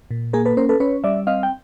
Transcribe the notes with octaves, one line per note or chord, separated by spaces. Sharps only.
A#2
A#3 G#4 A#4
A4 B4
C#4 A#4 C5
A4 B4
C#4 B4 C#5
G3 D5 E5
C4 D#5 F5
G5